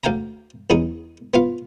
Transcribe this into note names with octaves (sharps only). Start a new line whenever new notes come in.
D2 F5 G5 G#5 A#5
E2 C#3 D#4 G#4
B3 F4 F5